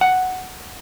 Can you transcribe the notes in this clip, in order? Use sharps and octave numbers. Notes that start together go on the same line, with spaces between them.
F#5